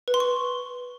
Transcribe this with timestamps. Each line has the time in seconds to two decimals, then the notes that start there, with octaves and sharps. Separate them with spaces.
0.08 B4
0.14 C6
0.20 C#6